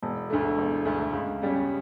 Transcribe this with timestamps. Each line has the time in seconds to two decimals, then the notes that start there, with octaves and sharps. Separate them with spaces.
0.02 E1
0.30 D2 D3 A3
0.58 E1
0.85 D2 D3 A3
1.13 C#2
1.42 C#3 G3 C#4